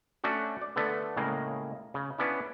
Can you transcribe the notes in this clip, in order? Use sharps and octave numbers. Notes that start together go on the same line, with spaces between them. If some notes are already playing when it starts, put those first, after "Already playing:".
A3 C#4 D4 F#4
D5
D3 A3 B3
A2 C#3 G#3 A#3
C#3
B3 C#4 D4 E4